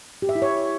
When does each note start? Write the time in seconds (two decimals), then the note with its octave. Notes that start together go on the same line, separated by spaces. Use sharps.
0.22 G4
0.29 E5
0.35 E4
0.42 C#5